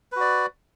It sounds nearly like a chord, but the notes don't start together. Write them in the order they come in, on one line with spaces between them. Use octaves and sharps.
B4 F#4 D5